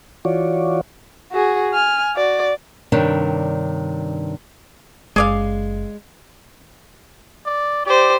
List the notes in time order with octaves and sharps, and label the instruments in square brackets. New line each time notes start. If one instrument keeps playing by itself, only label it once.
[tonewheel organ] E3 F4 F#4 C#5 D5
[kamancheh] F#4 G#4
G#5 F6
F#4 D5
[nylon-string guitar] G2 C3 D#3 D4 C#5 G5
[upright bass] F#1 [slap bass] G#3 [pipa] G#4 D5 F5
[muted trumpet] D5
[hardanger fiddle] G4 C5 [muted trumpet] D5